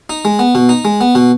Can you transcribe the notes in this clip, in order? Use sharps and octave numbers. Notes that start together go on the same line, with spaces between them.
D#4
G#3
B3
B2
D#4
G#3
B3
B2